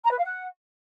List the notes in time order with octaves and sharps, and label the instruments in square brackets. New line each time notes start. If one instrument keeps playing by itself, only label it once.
[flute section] A#5
B4
F5
F#5